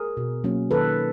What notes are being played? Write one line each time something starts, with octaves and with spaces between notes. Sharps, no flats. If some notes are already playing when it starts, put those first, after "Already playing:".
Already playing: G#4 A#4
B2
F#3 A#3 C#4
D#3 A4 B4